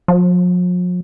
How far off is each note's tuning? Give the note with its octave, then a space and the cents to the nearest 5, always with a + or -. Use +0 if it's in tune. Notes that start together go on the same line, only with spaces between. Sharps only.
F3 +45